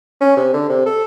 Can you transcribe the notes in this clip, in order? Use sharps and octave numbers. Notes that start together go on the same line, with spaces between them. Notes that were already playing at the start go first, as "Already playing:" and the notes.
C#4
C3
D3
C3
A4